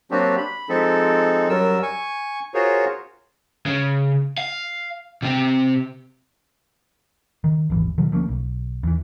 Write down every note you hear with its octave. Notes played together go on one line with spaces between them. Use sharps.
F#3 A#3 C4 D4 F#4 G4
B5
F3 G#3 C4 D#4 A4
F#2 F#3 G3 A#4 E6
G#5 C#6
F4 F#4 G#4 A#4 C5 C#5
C#3
F5
C3 C4
D#3
D#1 G#1 E3
B2 D#3 F3 F#3
D2 F3 A#3 C#4
B1
E2 E3